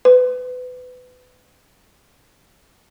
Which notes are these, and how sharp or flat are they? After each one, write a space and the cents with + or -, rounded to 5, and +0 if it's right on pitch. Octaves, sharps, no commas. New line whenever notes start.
B4 +25